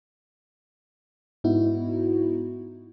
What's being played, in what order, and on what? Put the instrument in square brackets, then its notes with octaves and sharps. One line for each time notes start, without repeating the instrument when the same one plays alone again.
[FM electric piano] G#2 B3 D#4 E4 F#4